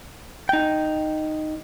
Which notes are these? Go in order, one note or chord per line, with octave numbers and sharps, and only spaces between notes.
D#4 G5